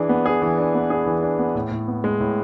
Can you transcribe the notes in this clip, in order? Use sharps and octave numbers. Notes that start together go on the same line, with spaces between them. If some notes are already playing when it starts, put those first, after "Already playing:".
Already playing: E3 D4 G#4
B3
G#4
E3
D4
B3
G#4
E3
D4
B3
A2
A2
B3
G#3
A2